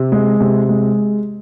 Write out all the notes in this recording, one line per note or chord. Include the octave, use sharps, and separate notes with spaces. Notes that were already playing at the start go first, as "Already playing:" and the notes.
Already playing: C3
G#3
C3
G#3